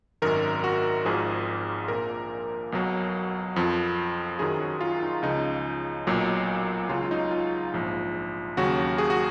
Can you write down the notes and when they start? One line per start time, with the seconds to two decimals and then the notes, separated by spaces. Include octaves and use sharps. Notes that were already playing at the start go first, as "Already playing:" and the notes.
0.22 G#1 F#2 D#3 A#4
0.64 F#4
1.05 G#1 G#2 F3 G#4
1.88 A#1 A#2 F3 A#4
2.72 B1 B2 F#3
3.56 F2 F3
4.39 F#2 D#3 F#3 G#4
4.61 F#4
4.81 F4
5.03 D#4
5.22 C#2 C#3 F3 D#4
6.07 B1 A#2 F#3
6.89 C#2 C#3 F#3 F4
7.04 F4
7.11 D#4
7.31 F4
7.73 A#1 G#2 F3
8.57 D#2 C#3 F#3 F#4
8.98 G#4
9.10 F#4